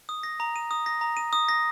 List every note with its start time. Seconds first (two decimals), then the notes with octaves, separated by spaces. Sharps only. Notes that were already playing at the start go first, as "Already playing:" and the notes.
0.09 D#6
0.23 A#6
0.40 A#5
0.56 D#7
0.71 D#6
0.86 A#6
1.01 A#5
1.17 D#7
1.33 D#6
1.48 A#6